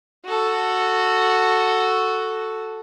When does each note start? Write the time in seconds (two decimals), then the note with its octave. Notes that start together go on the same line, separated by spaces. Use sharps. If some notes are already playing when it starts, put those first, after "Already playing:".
0.25 F#4 A4